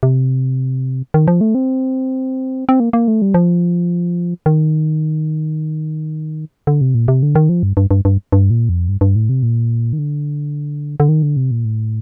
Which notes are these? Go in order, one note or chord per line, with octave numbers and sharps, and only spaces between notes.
C3
D#3
F3
A3
C4
C4
A#3
A#3
A3
G3
F3
D#3
D3
C3
A#2
C3
D3
D#3
F3
G2
G2
G2
G2
G2
A#2
F2
G2
G2
A2
C3
A#2
D#3
D3
D3
D#3
D3
C3
A#2
A2